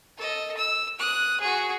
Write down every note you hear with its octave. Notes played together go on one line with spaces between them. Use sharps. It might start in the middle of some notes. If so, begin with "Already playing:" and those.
A4 D#5
E6
D#6 F#6
F#4 G#4